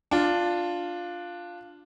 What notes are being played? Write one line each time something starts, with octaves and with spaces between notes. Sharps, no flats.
D4 F4